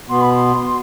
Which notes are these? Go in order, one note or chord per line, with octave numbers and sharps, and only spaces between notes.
B2 B3 C6
B5
C6